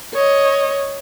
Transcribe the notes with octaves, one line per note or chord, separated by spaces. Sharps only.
C#5 D#5